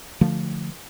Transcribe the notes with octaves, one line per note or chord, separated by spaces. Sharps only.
D3 F3 A3